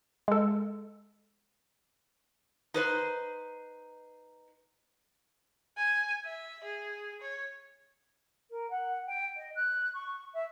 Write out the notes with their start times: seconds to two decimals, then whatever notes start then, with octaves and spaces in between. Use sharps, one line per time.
0.28 G#3 A4
2.74 D#4 B4 C5
5.77 G#5
6.25 E5
6.64 G#4
7.21 C#5
8.50 A#4
8.70 F#5
9.06 G5
9.36 D#5
9.55 F#6
9.93 C#6
10.33 E5